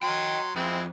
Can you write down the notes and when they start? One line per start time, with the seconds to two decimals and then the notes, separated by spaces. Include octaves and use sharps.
0.03 F#3 D#5 G5 C6
0.56 F2 G#3 C4 E4